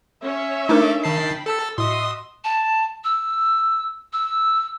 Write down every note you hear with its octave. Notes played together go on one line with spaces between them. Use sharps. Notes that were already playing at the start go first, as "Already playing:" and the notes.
C#4 C#5 E5
A3 D4 D#4 A#4 D6
D#3 G5 A5 B5 C7
A4 A5 E6
A2 F#4 D#5 E5 C6 D#6
A5
E6
E6